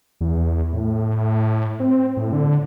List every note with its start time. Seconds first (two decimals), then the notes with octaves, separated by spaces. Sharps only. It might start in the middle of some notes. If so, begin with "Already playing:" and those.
0.21 E2
0.72 A2
1.80 C4
2.17 A2
2.33 D3